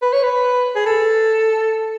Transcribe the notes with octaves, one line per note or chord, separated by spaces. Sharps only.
B4
C#5
B4
G#4
A4